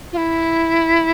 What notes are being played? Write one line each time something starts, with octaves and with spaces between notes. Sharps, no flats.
F4
E4